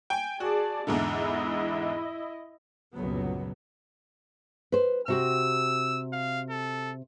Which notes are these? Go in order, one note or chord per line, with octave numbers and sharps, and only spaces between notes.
G5 G#5
F#4 G#4 D5 A5
E2 G#2 D3 E4 D#5
G1 C#2 A#2 F#3 B3
B4 C5
C3 F#4 G4 E6
F5
A4